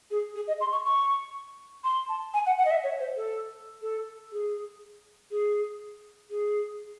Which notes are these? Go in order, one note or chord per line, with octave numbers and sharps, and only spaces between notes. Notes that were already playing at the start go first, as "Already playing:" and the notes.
G#4
G#4
D#5
C6
C#6
C#6
C6
A5
G#5
F#5
F#5
D#5
E5
C#5
C5
A4
A4
G#4
G#4
G#4